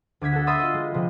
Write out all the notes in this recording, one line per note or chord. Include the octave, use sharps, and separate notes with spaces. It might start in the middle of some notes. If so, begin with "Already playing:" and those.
D2 D6 G#6 B6
F#4 A4
E5 B5 C6 D#6 E6 A6
F4 D#5
G#3
C3 F3 G#3